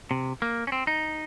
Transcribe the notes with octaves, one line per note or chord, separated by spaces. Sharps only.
C3
A#3
C#4
C4
D#4